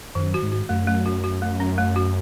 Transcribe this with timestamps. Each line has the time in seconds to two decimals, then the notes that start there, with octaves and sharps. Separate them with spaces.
0.15 F#2 D#3
0.34 F#4
0.43 G#2
0.52 F#4
0.69 F#2 A3
0.88 A3
1.06 F#4
1.24 F#4
1.42 A3
1.60 C#4
1.78 A3
1.96 F#4